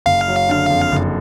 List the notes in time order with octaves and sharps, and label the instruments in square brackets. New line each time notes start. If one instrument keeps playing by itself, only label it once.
[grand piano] F#1 [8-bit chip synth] F5
[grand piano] F#3
D3
F2
F#1